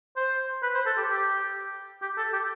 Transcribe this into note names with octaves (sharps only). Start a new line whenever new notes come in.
C5
B4
C5
A4
G4
G4
G4
A4
G4